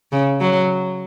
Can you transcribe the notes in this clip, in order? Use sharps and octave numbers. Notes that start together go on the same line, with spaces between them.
C#3
F#3